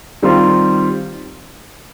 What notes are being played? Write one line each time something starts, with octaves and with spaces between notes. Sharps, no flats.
D#3 G3 C4 F4